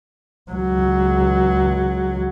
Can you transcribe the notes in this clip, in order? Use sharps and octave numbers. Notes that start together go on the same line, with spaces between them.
C#2 F#3